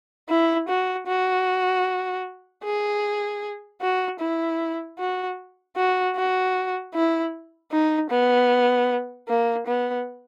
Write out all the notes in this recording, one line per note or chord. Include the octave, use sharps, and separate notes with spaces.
E4
F#4
F#4
G#4
F#4
E4
F#4
F#4
F#4
E4
D#4
B3
A#3
B3